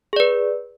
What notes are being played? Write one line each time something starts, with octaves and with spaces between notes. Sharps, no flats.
G#4 B4 D5